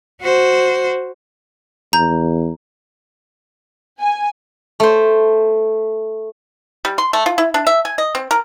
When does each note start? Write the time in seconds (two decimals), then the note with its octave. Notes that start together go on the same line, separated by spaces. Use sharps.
0.22 F#4 C5
1.93 E2 A#5 G6
4.00 G#5
4.80 A3 C5
6.85 G3
6.98 C6
7.13 A3
7.26 F4
7.38 E4
7.54 D4
7.67 E5
7.85 G#5
7.98 D#5
8.15 C4
8.31 A#4